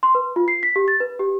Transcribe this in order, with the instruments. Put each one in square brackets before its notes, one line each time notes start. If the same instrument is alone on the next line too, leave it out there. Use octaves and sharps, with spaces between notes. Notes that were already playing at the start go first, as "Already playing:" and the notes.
[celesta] C6
B4
F4
C7
B6
G4
A6
B4
G4